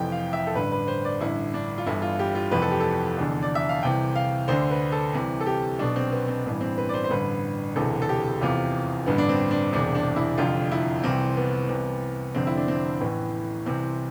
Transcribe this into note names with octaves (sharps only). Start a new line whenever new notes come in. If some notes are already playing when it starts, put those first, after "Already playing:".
Already playing: F1 F2 E3 G5
F5
E5
A4
A1 G2 D3 B4
B4
C5
D5
A1 G2 D3 E4
D4
F4
G1 G2 E3 E4
F4
G4
F4
F1 F2 E3 B4
A4
G4
A4
F1 E2 D3
D5
E5
F5
C2 C3 E3 G5
F5
D2 D3 C5
B4
A4
C2 C3 E3
A4
G4
B1 B2 D4
C4
B3
C4
A1 G2 E3 B3
C4
B4
D5
C5
C5
A1 G2 D3 B4
E1 D2 C3 E3 A4
A4
G4
F1 E2 C3 E3 F4
A1 G2 D3 B3
D4
C4
D4
E1 E2 C3 D4
D4
E4
F1 F2 D3 F4
E4
C2 C3 E3 C4
B3
C2 C3 E3
F1 F2 D3 C4
E4
D4
C4
A1 A2 E3 B3
C2 C3 E3 C4